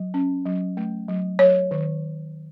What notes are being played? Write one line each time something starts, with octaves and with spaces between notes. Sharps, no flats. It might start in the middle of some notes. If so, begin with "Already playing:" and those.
Already playing: F#3
C#4
F#3
A3
F#3
F#3 C#5
D#3